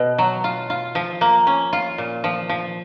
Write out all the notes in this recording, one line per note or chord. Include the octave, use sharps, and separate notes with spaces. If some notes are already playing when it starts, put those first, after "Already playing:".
Already playing: B2
F#3
F4
F4
F3
A#3
C#4
F4
A#2
F3
F3